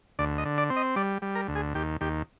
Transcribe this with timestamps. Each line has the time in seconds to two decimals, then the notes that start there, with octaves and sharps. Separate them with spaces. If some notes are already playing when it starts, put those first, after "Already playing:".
0.19 D2 D5
0.38 D#5
0.45 D3
0.58 D5
0.70 C4
0.76 D#5
0.96 G3 D5
1.22 G3
1.35 A#4
1.48 D2
1.55 G#4
1.74 D#2 G4
2.01 D#2 G4